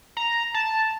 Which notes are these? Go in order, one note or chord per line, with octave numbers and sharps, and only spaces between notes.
A#5
A5